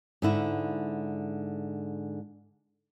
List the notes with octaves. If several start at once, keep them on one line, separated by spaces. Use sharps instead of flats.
G#2 D3 E4